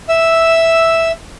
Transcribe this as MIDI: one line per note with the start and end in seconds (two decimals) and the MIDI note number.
0.09 1.12 76
0.09 1.12 88